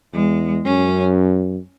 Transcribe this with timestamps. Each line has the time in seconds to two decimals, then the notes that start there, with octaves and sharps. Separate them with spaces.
0.13 E2 G#3
0.64 F#2 C#4